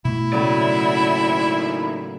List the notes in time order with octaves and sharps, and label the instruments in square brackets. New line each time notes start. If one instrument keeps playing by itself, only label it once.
[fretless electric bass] B2 A3 [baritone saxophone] E4
[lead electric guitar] D#2 D5 [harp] A2 C#3 F#3